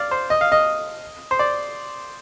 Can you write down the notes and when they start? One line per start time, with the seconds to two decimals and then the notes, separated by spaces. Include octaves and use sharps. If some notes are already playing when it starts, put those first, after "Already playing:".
Already playing: D5 F5
0.11 C5
0.30 D#5
0.41 F5
0.52 D#5
1.31 C5
1.39 D5